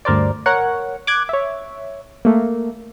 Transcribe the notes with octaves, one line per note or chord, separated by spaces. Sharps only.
D2 G2 A#4 C5 D5
A#4 C#5 F#5
D6 F#6 G#6
C#5 E5
A3 A#3